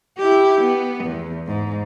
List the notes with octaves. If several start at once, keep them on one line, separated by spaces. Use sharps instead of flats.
E4 G4
B3
E2
G#2